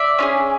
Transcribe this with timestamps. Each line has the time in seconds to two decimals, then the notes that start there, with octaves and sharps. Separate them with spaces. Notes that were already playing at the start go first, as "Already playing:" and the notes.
Already playing: D5 E5
0.19 C#4 F4 G#4